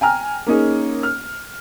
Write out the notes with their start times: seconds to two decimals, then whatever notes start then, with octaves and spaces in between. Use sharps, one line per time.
0.01 G5 G#5 A#5 F6
0.46 A#3 C#4 D#4 G#4
1.03 F6